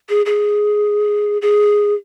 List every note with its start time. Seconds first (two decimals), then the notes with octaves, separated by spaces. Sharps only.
0.09 G#4
0.26 G#4
1.42 G#4